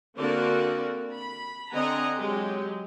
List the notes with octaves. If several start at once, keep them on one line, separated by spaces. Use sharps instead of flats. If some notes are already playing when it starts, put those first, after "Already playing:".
D3 A#3 C4 F#4 A#4 D5
B5
D3 C4 D#5 F#5 G#5 A#5
F#3 G#3 G4